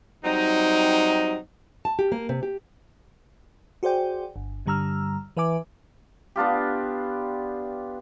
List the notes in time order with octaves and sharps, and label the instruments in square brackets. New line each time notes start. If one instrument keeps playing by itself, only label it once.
[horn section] F#3 G3 C4 D#4
[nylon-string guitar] A5
G4
A#3
C3
G4
[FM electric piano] F#4 G#4 C5 D5 G5
G1
G2 D3 G3 A#5 E6 F6
E3 B4 E5 G#5 D6
[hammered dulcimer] B3 D4 F4 G4